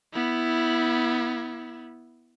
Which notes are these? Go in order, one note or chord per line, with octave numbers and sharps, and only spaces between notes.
B3 E4